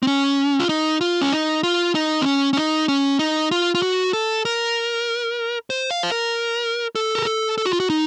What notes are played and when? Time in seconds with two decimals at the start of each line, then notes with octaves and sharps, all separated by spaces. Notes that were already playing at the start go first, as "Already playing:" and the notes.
0.03 C4
0.07 C#4
0.59 F4
0.69 D#4
1.01 F4
1.22 C#4
1.32 D#4
1.63 F4
1.95 D#4
2.22 C4
2.26 C#4
2.53 C#4
2.57 D#4
2.88 C#4
3.19 D#4
3.51 F4
3.75 F4
3.82 F#4
4.13 A4
4.45 A#4
5.70 C5
5.91 F5
6.03 C5
6.12 A#4
6.95 A4
7.15 A#4
7.26 A4
7.58 A4
7.65 F#4
7.73 F4
7.80 F#4
7.90 D#4